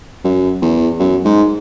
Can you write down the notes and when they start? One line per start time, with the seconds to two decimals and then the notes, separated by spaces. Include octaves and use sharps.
0.25 F#2
0.62 E2
0.99 F#2
1.25 G#2